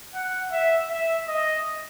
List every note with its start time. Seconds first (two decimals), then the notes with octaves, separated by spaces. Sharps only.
0.14 F#5
0.52 E5
0.90 E5
1.28 D#5